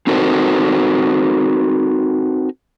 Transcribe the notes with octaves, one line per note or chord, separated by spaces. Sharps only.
C4 D#4 F#4 A4 A#4 C5